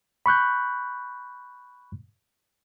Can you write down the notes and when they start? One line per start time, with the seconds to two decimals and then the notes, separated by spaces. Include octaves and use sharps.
0.26 B5 C#6 F#6 G6